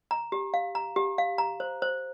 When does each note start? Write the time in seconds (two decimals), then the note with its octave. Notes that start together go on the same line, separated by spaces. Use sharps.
0.11 A#5
0.32 G4
0.54 F5
0.75 A#5
0.96 G4
1.18 F5
1.38 A#5
1.60 C5
1.82 C5